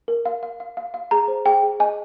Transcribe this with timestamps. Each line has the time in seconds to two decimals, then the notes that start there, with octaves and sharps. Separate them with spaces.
0.08 A#4
0.26 F5
0.43 F5
0.60 F5
0.77 F5
0.94 F5
1.11 G#4 A#5
1.28 C5
1.46 G#4 G5
1.63 G#4
1.80 D#5 G#5